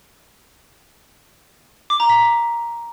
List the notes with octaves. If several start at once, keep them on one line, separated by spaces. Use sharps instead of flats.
D6
A#5
B6